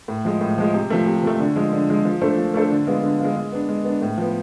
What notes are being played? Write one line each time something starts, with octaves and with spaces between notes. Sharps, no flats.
A2
F3 G#3
A2
F3 G#3
C3
F3 A3
C3
F3 A3
D3
F3 G#3
D3
F3 G#3
F3
A3 D4 A4 C5
F3
A3 D4 A4 C5
D3
G#3 B3 D4 F4
D3
G#3 B3 D4 F4
G#3
B3 D4
G#3
B3 D4
A2
F3 B3